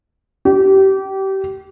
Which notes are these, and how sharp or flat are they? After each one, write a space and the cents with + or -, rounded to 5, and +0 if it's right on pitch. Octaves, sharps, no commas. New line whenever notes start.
G4 -25